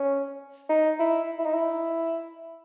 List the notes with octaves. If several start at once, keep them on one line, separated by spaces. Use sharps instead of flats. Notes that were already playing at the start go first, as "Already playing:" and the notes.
Already playing: C#4
D#4
E4
E4
D#4
E4